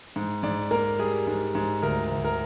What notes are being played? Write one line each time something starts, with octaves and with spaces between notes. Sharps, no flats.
G#2
G#2 D5
A#3 A#4
G3 G#4
G#2
G#2
D2 A#4
D2
A#4